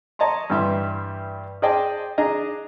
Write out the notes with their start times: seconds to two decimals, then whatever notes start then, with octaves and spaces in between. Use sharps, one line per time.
0.19 C#5 D#5 A5 A#5 C6
0.50 G2 E3 G3 E5 C6
1.62 G#4 C5 D5 D#5 G5 A5
2.18 D4 G#4 D#5 A#5